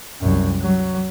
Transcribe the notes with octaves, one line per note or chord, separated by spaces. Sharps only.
C2 F#2
F#3